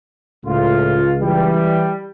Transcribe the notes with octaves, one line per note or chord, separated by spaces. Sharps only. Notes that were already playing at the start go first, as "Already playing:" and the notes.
C#2 A2 F4
E3 G3